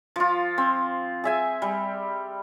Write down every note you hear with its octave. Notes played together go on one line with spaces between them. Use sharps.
F3 F4
C4
G#4 E5 G#5
G3